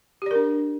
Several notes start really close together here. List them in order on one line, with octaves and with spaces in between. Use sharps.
G4 D5 A#4 D4